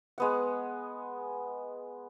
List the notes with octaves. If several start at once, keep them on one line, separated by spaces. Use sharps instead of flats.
G#3 B3 F#5